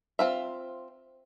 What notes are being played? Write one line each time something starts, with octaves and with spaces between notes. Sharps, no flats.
C4 F4 E5